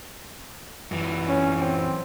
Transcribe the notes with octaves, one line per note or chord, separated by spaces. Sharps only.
F#2 E3
C#4
C4